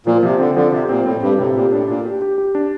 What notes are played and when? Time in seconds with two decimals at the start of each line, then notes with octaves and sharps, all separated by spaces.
0.06 A#2 F3
0.23 C3 F3
0.39 D3 C4
0.56 D3 F3
0.72 C3 G4
0.89 A#2 C4
1.05 A2 C4
1.22 G2 G4
1.38 A2 C3
1.55 A#2 G4
1.72 A2 D4
1.88 A#2 D4
2.06 G4
2.22 G4
2.38 G4
2.55 D4